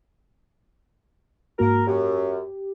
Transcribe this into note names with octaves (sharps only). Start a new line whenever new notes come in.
G#2 A#3 F#4 A#4
F#2 G4